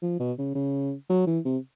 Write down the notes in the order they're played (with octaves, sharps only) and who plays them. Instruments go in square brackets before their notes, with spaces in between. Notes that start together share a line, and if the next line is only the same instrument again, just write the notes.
[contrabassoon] F3
B2
C#3
C#3
F#3
E3
C3